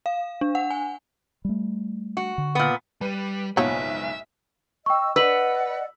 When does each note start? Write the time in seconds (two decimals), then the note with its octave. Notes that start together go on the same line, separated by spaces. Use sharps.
0.06 F5
0.41 D4
0.55 F#5
0.70 G#5
1.45 G3 A3
2.17 F#4
2.38 D3
2.55 A#2 B3
3.01 G3 B4 D#7
3.57 F#1 B1 G#2 F3 B3 C#5 E5
4.86 D#5 G5 C#6 E6
5.16 B4 D5 D#5 F#5 E6 F#7